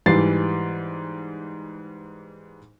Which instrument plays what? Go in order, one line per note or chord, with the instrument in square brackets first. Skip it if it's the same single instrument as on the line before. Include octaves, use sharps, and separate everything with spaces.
[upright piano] G#2 E3 G3 A6 C7